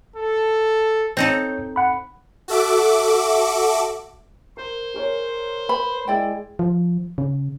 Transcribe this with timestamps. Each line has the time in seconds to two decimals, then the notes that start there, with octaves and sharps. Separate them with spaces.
0.16 A4
1.17 C4 D#4 A4 C#5 G6
1.76 F#5 B5
2.48 F#4 A4 E5 D6
4.57 A#4 C5
4.94 G#4 A#4 C#5
5.69 B4 B5
6.08 G#3 E4 D5 G5
6.59 F3
7.18 C#3